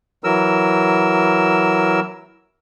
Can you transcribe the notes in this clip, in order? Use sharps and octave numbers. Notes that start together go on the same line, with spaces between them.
E3 F#3 A#4 E6